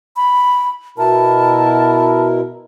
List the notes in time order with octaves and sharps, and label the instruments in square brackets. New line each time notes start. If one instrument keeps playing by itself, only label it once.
[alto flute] B5
[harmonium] B2 E4 A#4 [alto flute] A5